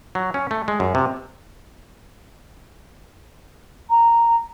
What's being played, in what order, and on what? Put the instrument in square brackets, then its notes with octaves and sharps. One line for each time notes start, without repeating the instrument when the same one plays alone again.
[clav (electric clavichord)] F#3
C#4
A3
G#3
F#2
C3
[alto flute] A#5